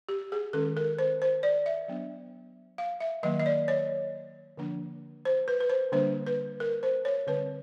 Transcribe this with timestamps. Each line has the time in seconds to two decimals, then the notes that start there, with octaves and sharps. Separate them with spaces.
0.09 G4
0.32 G#4
0.53 D#3 G#3 C#4 A4
0.77 A#4
0.99 C5
1.22 C5
1.43 D5
1.66 E5
1.88 F#3 B3 D4
2.78 F5
3.00 E5
3.23 D#3 F#3 A#3 D#5
3.40 D#5
3.46 D5
3.68 C#5
4.58 D3 F3 A#3 D4
5.25 C5
5.48 B4
5.60 B4
5.70 C5
5.92 D3 G3 A#3 D4 C5
6.27 B4
6.60 A#4
6.83 C5
7.05 C#5
7.27 D3 G3 C4 B4